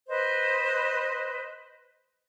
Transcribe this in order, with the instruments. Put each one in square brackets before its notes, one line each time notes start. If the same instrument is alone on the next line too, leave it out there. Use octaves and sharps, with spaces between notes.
[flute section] B4 C5 D#5